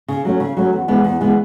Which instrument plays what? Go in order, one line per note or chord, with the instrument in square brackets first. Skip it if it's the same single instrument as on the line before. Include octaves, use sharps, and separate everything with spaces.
[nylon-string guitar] C#3
F#3 A3 C#4
C#3
F#3 A3 C#4
E2
C#3 E3 G#3 B3
E2
C#3 E3 G#3 B3